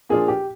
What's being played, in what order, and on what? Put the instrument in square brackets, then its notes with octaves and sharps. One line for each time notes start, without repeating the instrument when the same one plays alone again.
[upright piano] A#2 F3 A#3 D4 F4 [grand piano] G#4
[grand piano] G4